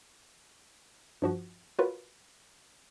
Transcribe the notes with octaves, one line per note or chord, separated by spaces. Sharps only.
G2 F3 F#4
F4 F#4 A#4 B4 C#5